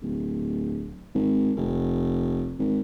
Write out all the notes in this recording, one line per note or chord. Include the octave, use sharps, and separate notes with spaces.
D1
G#1
F1
G#1